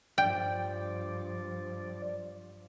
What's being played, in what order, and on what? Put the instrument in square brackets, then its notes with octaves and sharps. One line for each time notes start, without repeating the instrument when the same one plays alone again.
[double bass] G2 F3 [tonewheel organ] D5 [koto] G5